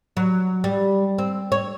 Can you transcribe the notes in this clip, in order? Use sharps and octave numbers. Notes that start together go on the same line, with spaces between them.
F#3
G3
C4
C#5